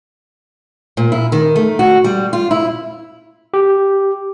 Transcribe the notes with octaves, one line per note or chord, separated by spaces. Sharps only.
A#2
E4
D#3
A3
F#4
G3
F4
E4
G4